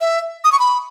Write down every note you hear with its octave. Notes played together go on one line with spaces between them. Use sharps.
E5
D#6
C#6
B5